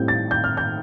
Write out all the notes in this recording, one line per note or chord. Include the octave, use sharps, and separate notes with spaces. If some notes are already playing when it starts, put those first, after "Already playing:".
Already playing: A2 G3 C4 G6
A6
G6
F6
G6